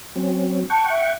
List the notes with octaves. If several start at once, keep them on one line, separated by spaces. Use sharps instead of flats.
F#3 C4 C#4
F#5 G5 A5 C#6
E5